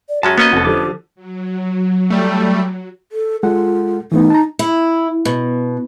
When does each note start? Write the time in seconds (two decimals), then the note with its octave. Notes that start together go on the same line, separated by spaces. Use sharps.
0.09 D5
0.23 F#2 G#3 C#4 F#4 A5
0.38 A#3 B3 C#4 D#5
0.52 F1 C4 F#4 A4
0.65 D3 F3 G4 D6
1.15 F#3
2.10 G3 A3
3.12 A4
3.43 G#3 F4 A4 F#5
4.12 E3 A3 B3 D#4
4.30 A5 A#5
4.59 E4
5.25 B2